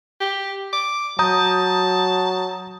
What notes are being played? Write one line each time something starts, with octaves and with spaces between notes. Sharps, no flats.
G4
D6
F#3 A5 A#5 D#6 G6